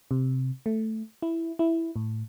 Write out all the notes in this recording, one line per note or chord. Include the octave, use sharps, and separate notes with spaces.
C3
A3
E4
E4
A2